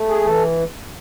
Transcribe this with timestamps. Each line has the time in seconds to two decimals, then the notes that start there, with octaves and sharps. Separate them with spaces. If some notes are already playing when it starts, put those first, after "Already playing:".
Already playing: A3
0.09 G#4
0.25 E3 A4